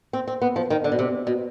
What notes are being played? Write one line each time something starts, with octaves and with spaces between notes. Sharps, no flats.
C4
C4
B3
F3
D#3
D3
B2
C3
B2